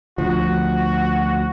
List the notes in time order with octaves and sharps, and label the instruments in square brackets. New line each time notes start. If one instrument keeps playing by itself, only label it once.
[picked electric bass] D2 F3 [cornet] F#4